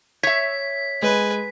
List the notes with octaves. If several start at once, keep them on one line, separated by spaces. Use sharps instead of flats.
C#5 E5 B6
G#3 B4 G#5